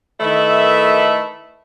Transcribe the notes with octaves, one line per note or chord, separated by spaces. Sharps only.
D#3 A3 E4 B4 D#5 E5